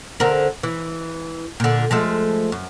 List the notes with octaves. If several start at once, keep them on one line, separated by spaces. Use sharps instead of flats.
D3 C4 A#4
E3
A#2 D3
F3 G#3 A3
F#2